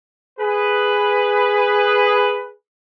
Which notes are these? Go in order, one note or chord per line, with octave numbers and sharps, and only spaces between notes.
G#4 B4